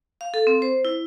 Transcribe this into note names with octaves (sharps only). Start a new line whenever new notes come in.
F5
A4
C4
C5
E4